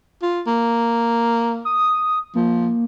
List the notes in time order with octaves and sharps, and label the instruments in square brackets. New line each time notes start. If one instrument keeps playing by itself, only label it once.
[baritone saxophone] F4
A#3
[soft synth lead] D#6
[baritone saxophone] F3 [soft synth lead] A#3